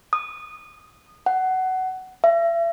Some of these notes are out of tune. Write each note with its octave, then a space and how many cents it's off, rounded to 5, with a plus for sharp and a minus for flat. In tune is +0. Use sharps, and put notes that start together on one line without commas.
D#6 -20
F#5 +15
E5 +40